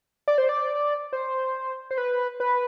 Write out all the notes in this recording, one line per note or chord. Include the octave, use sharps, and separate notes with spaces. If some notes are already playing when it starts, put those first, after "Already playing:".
D5
C5
D5
C5
C5
B4
B4